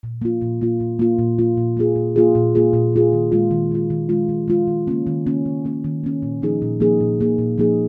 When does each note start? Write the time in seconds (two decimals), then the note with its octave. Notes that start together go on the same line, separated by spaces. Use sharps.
0.03 A#2
0.22 A#3 F4
0.41 A#2
0.61 A#3 F4
0.80 A#2
0.99 A#3 F4
1.19 A#2
1.39 A#3 F4
1.57 A#2
1.77 A#3 F4 G#4
1.96 A#2
2.16 A#3 F4 G#4
2.35 A#2
2.55 A#3 F4 G#4
2.73 A#2
2.93 A#3 F4 G#4
3.13 D#3
3.32 G#3 F4
3.51 D#3
3.71 G#3 F4
3.90 D#3
4.09 G#3 F4
4.29 D#3
4.48 G#3 F4
4.68 D#3
4.87 A#3 C#4
5.07 D#3
5.26 A#3 C#4
5.46 D#3
5.65 A#3 C#4
5.84 D#3
6.04 A#3 C#4
6.23 A#2
6.42 F3 A#3 D#4 G#4
6.62 A#2
6.80 F3 A#3 D#4 G#4
7.01 A#2
7.20 F3 A#3 D#4 G#4
7.38 A#2
7.58 F3 A#3 D#4 G#4